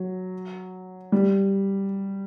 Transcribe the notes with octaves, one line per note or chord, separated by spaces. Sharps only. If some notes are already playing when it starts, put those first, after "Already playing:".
Already playing: F#3
G3